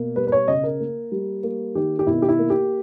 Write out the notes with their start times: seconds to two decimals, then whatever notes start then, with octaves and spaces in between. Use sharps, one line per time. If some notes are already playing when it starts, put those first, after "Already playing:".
Already playing: B2 A#3
0.16 G3 B4
0.27 B4
0.32 C#5
0.48 C#3 D#5
0.63 A#4
0.80 A#3
1.12 G3
1.43 A#3
1.75 D#3 G4
1.99 G4
2.07 B2 E4
2.22 G4
2.29 E4
2.39 A#3
2.50 G4